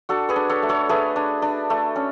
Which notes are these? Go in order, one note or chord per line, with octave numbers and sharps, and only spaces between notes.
D4 F#4 A4
G#4 B4
D4
A4 C#5
A3
A4 C#5
A3 G#4 B4
D4
D4
A3
C#4